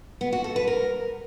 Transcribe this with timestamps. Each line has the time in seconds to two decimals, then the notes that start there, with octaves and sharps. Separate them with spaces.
0.21 B3
0.33 F#4
0.44 A4
0.56 B4
0.68 A#4